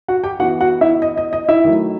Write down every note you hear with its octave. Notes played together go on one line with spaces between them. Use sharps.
F#4 F#5
G4 G5
E3 B3 E4 F#4 F#5
F#4 F#5
E4 E5
D#5
D#5
D#5
E4 E5
D#3 F#3 A3